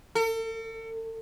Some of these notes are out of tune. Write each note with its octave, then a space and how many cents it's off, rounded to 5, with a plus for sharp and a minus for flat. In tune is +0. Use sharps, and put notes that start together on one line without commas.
A4 +40